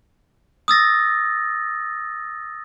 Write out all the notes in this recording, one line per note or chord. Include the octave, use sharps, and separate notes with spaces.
D#6 E6 A6 A#6